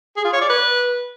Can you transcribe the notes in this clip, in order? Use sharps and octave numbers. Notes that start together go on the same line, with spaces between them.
G#4
F4
C#5
D5
B4